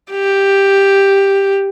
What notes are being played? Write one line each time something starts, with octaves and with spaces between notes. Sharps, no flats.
G4